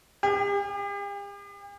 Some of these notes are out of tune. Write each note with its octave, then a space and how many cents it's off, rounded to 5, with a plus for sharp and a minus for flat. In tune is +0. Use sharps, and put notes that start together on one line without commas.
G4 +45